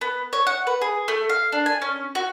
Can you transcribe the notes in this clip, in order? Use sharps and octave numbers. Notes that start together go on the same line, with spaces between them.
B3
C#5
F#5
B4
G#4
A3
F5
D4
G#5
C#4
F#4